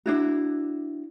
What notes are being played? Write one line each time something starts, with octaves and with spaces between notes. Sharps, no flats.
D4 E4 F#4